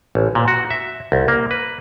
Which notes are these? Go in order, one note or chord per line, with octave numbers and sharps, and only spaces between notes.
A1
A#2
F#4
E5
C2
A#3
B4